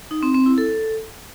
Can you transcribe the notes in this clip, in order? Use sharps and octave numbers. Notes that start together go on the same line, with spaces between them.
D#4
C4
C4
E4
A4